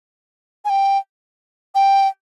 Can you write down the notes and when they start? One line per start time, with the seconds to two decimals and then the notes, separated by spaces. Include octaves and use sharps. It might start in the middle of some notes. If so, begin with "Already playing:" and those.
0.65 G#5
0.69 G5
1.75 G5